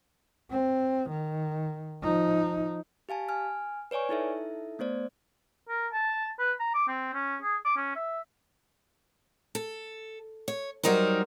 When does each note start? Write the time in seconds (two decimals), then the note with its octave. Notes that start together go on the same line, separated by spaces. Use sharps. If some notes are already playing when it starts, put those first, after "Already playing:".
0.50 C4
1.10 D#3
2.02 F3 D#4
3.09 G4 F5 G#5 A5
3.29 G#5 F6
3.91 B4 C#5 D5 G#5 C#6
4.09 D#4 E4 A4 E5
4.79 A3 B3 C5 D5
5.68 A#4
5.93 A5
6.39 B4
6.60 A#5
6.74 D6
6.88 C4
7.14 C#4
7.42 G#4
7.65 D6
7.77 C#4
7.96 E5
9.55 A4
10.48 C#5
10.83 F#3 G3 D#4 A#4 C5